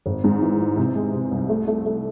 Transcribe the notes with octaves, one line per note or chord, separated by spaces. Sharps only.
G#1
G#2
E3
E3
C3
G#3
C3
C2
A3
A3
A3